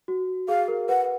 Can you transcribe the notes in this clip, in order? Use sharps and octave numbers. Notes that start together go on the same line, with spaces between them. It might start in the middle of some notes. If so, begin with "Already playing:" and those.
F#4
G#4 F5
A#4
B4 F#5